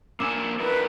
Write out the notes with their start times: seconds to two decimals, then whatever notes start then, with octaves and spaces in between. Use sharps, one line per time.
0.20 A#3 D4 G#5 D6 E6 E7
0.60 D4 E4 A#4 B4